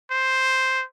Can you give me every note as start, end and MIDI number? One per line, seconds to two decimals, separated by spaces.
0.11 0.84 72